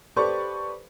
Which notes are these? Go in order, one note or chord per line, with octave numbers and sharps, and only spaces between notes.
G4 A4 B4 C5 D5 C#6